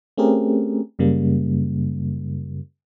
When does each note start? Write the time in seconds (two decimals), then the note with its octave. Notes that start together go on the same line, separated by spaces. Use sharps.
0.18 A3 C4 C#4 G4 G#4 A#4
0.99 F#2 C#3 G3 A#3